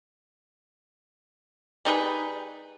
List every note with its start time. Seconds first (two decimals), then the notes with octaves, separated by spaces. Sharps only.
1.85 G3 D#4 G#4 B4